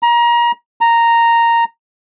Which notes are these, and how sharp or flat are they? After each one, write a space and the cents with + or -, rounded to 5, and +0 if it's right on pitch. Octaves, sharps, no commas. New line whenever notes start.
A#5 +30
A#5 -5